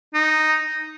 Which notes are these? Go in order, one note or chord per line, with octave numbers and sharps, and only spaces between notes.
D#4